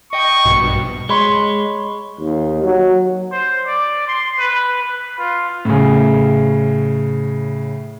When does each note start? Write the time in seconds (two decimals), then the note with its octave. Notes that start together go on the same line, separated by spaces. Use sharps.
0.13 D#5 G5 C#6
0.45 A#1 G2 B2
1.09 G#3 C#5 B5 C6
2.20 D#2
2.64 F#3
3.31 C5
3.67 D5
4.08 C6
4.39 B4
4.83 B4
5.18 F4
5.65 A2 C#3